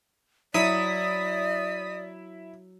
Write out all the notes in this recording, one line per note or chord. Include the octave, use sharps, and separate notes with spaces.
F#3 E4 D5 D#6 B6